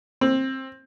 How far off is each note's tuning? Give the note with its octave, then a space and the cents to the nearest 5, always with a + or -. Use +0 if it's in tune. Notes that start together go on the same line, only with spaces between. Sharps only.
C4 +20